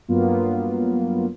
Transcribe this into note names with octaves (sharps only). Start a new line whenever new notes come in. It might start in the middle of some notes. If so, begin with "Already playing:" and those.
G2 F#3 A#3 B3 F4